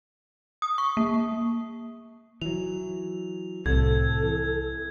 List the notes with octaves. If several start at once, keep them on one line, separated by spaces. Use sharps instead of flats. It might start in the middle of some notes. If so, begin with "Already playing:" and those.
D#6
C#6
A#3
E3 F#3 F7
C2 A2 C4 A4 G#6
E3